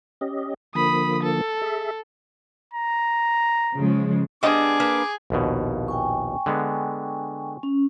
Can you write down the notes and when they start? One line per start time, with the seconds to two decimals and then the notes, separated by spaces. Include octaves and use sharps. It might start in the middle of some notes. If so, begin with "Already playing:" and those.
0.21 C#4 G4 D#5
0.75 D3 F3 A#3 B5 D#6
1.23 A4
1.62 G#4 E5
2.74 A#5
3.76 C#3 F3 G#3
4.43 G3 B3 D4 G#4 D#5 D6
4.80 A#3 B4
5.30 A#1 D#2 B2
5.88 G5 G#5 C#6
6.46 D3 G#3 B3
7.63 C#4